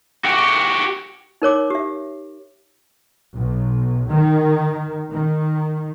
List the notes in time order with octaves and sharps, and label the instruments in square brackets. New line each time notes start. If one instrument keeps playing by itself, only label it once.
[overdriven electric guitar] F#4 G4
[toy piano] D#4 A#4 C#5 D6
G4 E5
[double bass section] B1
D#3
D#3